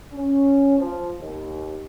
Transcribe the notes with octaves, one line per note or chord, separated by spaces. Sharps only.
C#4
F3
D#2